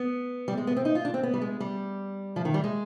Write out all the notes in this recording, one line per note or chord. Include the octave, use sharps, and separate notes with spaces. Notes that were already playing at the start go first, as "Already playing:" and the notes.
Already playing: B3
G3
G#3
B3
C4
D#4
F4
D4
C4
B3
G3
G#3
G3
F3
D#3
G3
G#3